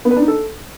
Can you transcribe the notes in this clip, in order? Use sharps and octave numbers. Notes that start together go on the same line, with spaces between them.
B3
B4
D4
D#4
A4